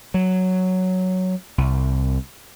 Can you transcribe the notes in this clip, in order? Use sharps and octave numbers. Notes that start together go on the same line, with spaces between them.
F#3
C2